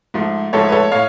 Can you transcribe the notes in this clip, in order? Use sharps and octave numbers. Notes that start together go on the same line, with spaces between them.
G#2 F3 A3
G#2 F3 A3 A4 C#5
B4
A4 C#5
A2 C#5 F5